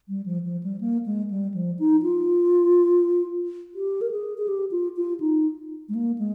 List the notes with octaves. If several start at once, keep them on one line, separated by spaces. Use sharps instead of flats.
G3
F3
F3
G3
A#3
G#3
G3
F3
D#4
F4
G4
A#4
G#4
G#4
G4
F4
F4
D#4
G#3
A#3
G#3